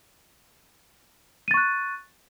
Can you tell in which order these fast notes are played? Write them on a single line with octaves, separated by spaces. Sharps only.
D#7 A6 C#6 F#6